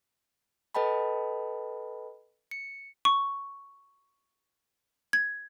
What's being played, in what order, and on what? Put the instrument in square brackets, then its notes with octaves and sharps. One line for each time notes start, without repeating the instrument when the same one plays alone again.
[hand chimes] A4 B4 D#5 G5 A5 B5
C#7
[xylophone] C#6
G#6